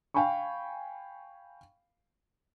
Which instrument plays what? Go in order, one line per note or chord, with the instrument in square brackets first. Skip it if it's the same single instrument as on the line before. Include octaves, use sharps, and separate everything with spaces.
[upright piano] F5 G5 G#5 B5 C#6